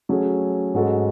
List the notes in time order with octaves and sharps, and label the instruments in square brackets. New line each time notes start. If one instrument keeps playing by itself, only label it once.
[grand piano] F#3 A3 C#4 G#4
G#2 G#3 C#4 F#4 A4